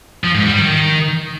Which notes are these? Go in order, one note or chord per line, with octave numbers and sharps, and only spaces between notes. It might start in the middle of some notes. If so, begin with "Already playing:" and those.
F3
G#2
G3
D#3